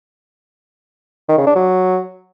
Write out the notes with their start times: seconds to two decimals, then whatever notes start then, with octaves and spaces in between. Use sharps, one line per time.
1.29 D#3
1.38 C#3
1.47 D4
1.55 F#3